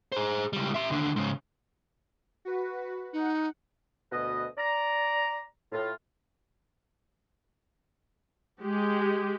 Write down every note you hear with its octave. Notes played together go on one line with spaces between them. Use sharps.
G#4 C5
C#2 G3
E5 C6
D#2 D3
G#2 C#3
F#4 B4
D#4 F#5
D2 B2 B4 D#5
D5 A#5
A2 F4
G#3 G4